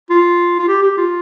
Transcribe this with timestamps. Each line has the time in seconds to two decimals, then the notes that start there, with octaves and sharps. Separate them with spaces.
0.10 F4
0.59 F4
0.68 G4
0.82 G4
0.97 F4